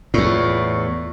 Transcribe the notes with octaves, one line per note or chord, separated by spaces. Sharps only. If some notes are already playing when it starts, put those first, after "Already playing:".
E2 A2 F4 D5 C#6